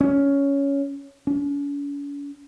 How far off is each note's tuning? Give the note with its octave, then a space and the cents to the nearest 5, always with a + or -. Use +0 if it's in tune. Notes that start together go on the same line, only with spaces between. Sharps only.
C#4 +10
C#4 +45